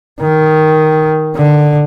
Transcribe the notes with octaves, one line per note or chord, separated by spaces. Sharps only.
D#3
D3